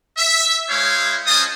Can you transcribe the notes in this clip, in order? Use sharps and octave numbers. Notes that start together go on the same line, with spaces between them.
E5
G#3 E4 C5 C#5 F5
C#4 F4 C5 D#5 A5 D#6